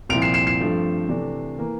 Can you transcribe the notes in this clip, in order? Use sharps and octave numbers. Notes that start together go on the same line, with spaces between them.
C2 A#2 F3 C4 E4 D7 F7
C7 E7
C7 E7
C7 E7
G2 F3 A3 C4
C3 E3 A3 D4
E3 A#3